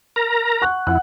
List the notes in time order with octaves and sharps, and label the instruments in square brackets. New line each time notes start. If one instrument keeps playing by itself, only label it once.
[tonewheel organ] A#4 A#5
[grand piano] F#5 C#6 F#6
[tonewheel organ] F2 E4 [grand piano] F#5 F#6